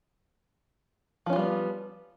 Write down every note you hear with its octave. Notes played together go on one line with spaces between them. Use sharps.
F3 G3 B3 C#4 F4